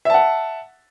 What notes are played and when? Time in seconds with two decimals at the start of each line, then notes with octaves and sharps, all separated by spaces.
0.05 E5
0.10 A5
0.14 F#5